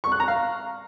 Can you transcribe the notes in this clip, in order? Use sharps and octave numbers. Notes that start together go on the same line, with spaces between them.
C#6
F#6
A#5
F5